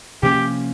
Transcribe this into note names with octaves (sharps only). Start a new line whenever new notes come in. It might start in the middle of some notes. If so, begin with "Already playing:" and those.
C3 F3 A#3 C#4 G4